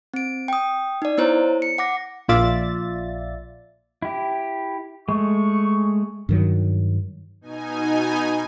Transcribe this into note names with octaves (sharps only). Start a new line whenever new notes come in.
C4 D7
G5 D#6
D#4 D5
B3 E4 C5 C#5 A#5
C#7
F#5 D6 A#6
A#1 A#2 F4 D5 E5 A6
E4 G4
G#3 A3 C#6
G2 D#3 F#3
B2 D#4 G#5